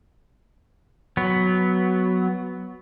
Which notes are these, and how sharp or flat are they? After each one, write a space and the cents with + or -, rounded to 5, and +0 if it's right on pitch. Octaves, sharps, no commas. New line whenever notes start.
F#3 +0 B3 +0